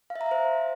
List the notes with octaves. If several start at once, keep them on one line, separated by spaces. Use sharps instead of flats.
F5
E5
A#5
E5
C5